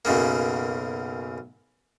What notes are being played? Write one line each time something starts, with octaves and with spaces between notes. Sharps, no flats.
B1 F#2 C#3 A#3